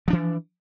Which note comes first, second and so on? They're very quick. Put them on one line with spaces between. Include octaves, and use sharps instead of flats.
F3 D4 E3